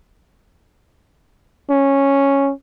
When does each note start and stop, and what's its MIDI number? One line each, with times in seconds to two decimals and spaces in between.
1.70 2.52 61